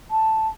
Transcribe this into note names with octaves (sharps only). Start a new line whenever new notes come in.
A5